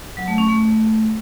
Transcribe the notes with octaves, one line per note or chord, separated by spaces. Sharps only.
F#3
A3
C#4
A3